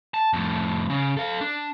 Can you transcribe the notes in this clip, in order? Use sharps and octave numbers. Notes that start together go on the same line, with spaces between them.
A5
F2 A2
C#3
A4 F5
D4